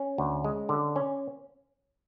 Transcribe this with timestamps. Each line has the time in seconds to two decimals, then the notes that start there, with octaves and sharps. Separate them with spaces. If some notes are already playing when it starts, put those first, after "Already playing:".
Already playing: C#4
0.18 D2
0.44 G#3
0.69 D3
0.96 C#4